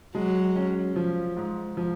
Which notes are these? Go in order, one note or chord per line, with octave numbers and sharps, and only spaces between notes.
F#3 G#3
C#4
F3
G#2
F3